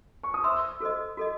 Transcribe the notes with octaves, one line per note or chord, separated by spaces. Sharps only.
C#6
D#6
C5 E5 C6 E6
F#4 A4 C5 D#5
F#4 A4 D#5